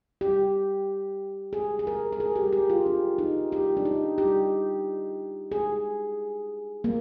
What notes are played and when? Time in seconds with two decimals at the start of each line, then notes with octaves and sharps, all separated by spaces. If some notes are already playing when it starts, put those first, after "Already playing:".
0.21 G4
1.53 G#4
1.79 G#4
1.87 A#4
2.12 A#4
2.20 G#4
2.36 G4
2.53 G4
2.70 F4
2.86 D4
3.18 D#4
3.52 G4
3.77 D4
3.85 D#4
4.18 G4
5.52 G#4
6.84 A#3